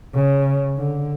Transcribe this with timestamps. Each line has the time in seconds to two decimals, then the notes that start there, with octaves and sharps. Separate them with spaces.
0.14 C#3
0.77 D3